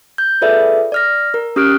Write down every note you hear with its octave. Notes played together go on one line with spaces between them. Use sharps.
G6
F4 G#4 A4 B4 D5 E5
D5 F6 A#6
A#4
C#4 G4 D#6 F6 F#6 D7